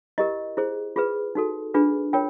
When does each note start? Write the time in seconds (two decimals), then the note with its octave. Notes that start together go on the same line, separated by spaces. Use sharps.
0.18 E4 G4 A#4 D#5
0.57 E4 G#4 C5
0.96 F4 G#4 B4
1.35 D#4 F#4 A4
1.74 D4 F4 G#4 B4
2.13 F4 A#4 C#5 G5